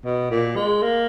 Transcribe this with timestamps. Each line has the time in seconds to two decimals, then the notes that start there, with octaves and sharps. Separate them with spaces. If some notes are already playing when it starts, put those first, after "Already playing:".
0.05 B2
0.31 A#2
0.56 G#3
0.83 A#3